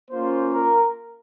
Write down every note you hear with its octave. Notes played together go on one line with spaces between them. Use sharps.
A#3 C#4 F4 C5
A#4